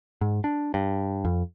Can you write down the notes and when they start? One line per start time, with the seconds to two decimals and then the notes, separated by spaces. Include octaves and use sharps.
0.21 G#2
0.44 D4
0.74 G2
1.25 F2